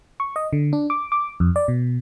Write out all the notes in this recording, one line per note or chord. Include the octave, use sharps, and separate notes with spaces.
C#6
D#5
D3
D4
D6
D6
F2
D5
B2